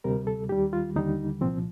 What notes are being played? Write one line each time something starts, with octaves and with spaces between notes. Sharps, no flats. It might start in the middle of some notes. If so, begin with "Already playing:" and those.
D2 C3 G3 A#4
A4
D#2 D#3 G3 G4
F4
D#2 D3 G3 D#4
C2 A#2 F3 C4